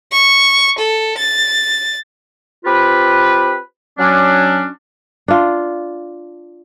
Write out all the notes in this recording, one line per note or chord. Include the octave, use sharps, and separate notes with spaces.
C#6
A4
A6
C4 F4 G4 B4
F#3 C#4 D4
D4 F4